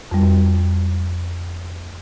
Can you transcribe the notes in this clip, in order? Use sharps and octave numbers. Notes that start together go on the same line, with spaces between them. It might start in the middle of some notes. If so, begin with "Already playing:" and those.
F2 G3